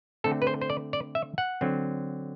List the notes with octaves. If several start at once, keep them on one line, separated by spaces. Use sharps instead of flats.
D3 A3 C4 A4
B4
C5
C5
D5
D5
E5
F#5
D3 F#3 C4